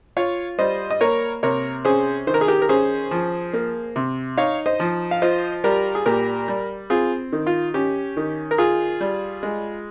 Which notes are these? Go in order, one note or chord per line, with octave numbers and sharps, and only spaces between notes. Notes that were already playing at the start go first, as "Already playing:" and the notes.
F4 C#5 F5
G3 C5 D#5
D#5
A#3 A#4 C#5
C3 A#4 C#5
C#4 G#4 C5
D#3 C5
A#4
G#4
G4 A#4
A#4
C#4 G#4 C5
F3
A#3
C3
D#4 C#5 F5
C5 D#5
F3
F5
F4 C5 D#5
G3 G4 A#4
G#4
A#2 G4 A#4
G3
C4 F4 G#4
D#3
F4
C#4 G4
D#3
A#4
F4 G#4
G3
G#3